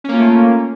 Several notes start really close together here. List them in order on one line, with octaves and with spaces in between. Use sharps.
C#4 A#3 F4 A3